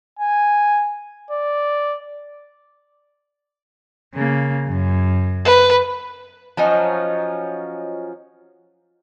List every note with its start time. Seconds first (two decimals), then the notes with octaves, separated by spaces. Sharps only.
0.19 G#5
1.31 D5
4.14 C#3 A#3
4.67 F#2
5.45 B4
6.57 F3 F#3 C#4 D#4